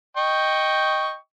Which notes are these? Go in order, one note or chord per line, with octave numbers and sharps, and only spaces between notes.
D#5 G5 C#6